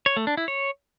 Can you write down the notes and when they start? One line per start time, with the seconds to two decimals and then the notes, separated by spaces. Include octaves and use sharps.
0.06 C#5
0.17 A3
0.27 D4
0.37 E4
0.48 C#5